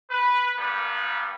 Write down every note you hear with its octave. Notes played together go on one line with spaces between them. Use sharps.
B4
G2 G3 A#3 B3 A#4